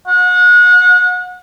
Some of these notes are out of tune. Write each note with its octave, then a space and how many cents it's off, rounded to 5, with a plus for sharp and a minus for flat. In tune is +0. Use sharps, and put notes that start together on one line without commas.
F#5 -30